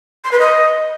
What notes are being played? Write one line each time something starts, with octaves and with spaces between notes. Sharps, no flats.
C6
B4
D#5